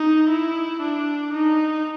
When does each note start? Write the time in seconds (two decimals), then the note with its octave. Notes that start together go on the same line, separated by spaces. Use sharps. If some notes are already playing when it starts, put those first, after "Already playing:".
Already playing: D#4
0.30 E4
0.81 D4
1.33 D#4